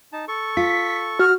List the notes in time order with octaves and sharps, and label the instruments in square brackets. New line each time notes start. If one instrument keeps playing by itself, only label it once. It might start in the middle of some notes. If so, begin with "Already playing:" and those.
[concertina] D#4 A5
A4 C#6
[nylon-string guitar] F4 [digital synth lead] B6
[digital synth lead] F#4 [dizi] F6